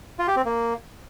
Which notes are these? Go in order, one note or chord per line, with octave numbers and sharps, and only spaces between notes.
F4
G4
C4
A#3